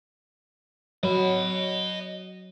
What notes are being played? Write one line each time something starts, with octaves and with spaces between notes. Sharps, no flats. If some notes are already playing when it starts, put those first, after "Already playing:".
F#3 D#5 B5